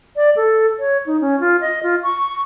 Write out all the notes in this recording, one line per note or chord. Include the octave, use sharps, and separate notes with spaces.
D5
A4
C#5
D#4
C#4
F4
D#5
F4
C#6